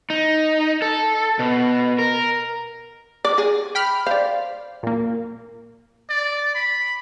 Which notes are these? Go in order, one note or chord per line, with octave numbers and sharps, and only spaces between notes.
D#4
A4
B2
A#4
D5
G#4
G5 B5 F6
C5 D5 F5
A#2 A#3
D5
B5